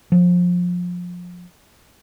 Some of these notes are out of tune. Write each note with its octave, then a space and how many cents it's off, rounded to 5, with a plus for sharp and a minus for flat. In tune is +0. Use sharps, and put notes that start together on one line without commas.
F3 +25